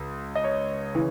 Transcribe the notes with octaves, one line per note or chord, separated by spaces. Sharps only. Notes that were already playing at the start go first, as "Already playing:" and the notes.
Already playing: C#2
D#5
C#5
C#3 E3